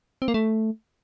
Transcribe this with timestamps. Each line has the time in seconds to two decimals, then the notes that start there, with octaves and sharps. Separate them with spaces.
0.22 C4
0.28 A#3
0.34 A3